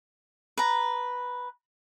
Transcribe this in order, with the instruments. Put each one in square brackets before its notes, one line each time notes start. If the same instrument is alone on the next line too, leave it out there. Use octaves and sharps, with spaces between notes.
[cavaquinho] B4 A#5